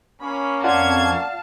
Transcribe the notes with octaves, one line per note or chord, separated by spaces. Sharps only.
A#3 C#4 B5
F2 F4 D5 F5 F#5 A5 G#6